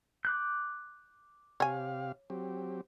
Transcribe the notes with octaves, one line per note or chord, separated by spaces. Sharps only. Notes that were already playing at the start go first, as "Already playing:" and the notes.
D6 F#6 G6
C3 G4 C#5 F5 G#5
F#3 C4 G4